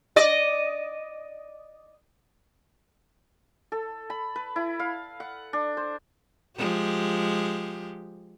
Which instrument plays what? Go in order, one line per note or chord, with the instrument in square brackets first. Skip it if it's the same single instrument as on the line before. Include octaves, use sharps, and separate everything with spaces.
[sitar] D5 D#5
[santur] A4
B5
B4
E4
F5
F#5
D4
C5
[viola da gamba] F3 G#3 G4